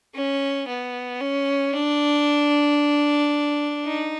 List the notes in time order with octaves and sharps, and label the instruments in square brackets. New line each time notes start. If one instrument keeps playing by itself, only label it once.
[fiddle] C#4
B3
C#4
D4
D#4